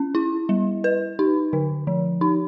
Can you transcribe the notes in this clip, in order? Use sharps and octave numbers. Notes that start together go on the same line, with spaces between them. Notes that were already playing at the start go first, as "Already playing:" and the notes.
Already playing: C#4
E4
G3
B4
D#4
D3
F3
D#4